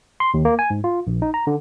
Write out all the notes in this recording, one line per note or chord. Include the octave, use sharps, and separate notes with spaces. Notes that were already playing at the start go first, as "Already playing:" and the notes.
C6
D#2
A#3
G#5
G#2
F4
A#1
D#4
A#5
D3